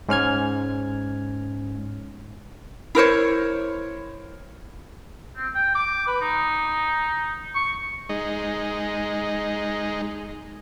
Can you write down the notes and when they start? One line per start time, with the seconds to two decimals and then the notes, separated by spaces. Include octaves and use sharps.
0.09 G#2 C#4 F6 G#6
2.95 E4 A#4 C5 C#5
5.36 C4
5.55 G5
5.75 D6
6.07 B4
6.21 D#4
7.55 C#6
8.09 G#3 D#4